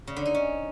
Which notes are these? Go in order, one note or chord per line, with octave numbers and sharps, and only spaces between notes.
C#3
D3
D#4
C#4